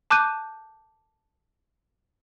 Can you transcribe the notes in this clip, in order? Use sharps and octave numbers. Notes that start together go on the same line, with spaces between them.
A5 D6 F#6 G6 D#7